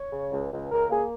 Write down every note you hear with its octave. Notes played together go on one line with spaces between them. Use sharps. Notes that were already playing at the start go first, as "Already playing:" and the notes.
Already playing: C#5
C#3
C#2
C#2
C#2 A#4
A#3 G#4